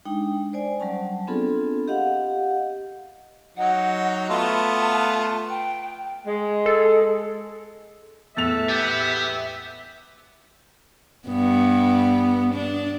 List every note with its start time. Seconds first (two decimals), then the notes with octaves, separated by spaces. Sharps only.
0.05 G#3 D4 D#4 G5
0.53 C5 D5 G#5
0.80 F#3 G3 C#4 A5
1.27 B3 C4 D4 F4 G#4 A4
1.88 G4 D#5 F5 F#5
3.57 F#3 D#4 F#5
4.29 A3 B3 F4 A5
5.50 G5
6.26 G#3
6.66 A4
8.37 E2 A2 A4 E5 F7
8.69 B3 G4
11.28 G2 B3
12.54 D4